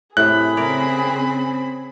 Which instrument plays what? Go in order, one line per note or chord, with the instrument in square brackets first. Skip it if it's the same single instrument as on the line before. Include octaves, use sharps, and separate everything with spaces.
[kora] A2 C3 [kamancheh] G#4 B5 [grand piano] F#6
[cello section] C#3 C4 [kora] A#4 C#5 D5